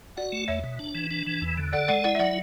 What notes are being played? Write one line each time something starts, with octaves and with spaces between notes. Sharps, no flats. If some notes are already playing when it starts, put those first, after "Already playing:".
F#4 D5 F#5
A3
E2 C#5 E5
B2
D4
E3
D4
E3
E2
D3
A4 D5 F#5
G#3 D5 F#5
E4 D5 F#5
E5
F#3 D5 F#5